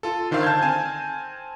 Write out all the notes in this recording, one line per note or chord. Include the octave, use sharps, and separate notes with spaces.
F4 A4
D3 D#3 D4 C5 F5 E6
A5 F6 G6 G#6
C4 G#5 A5